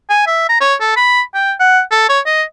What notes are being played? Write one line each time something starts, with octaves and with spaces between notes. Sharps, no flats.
G#5
E5
A#5
C#5
A4
B5
G5
F#5
A4
C#5
D#5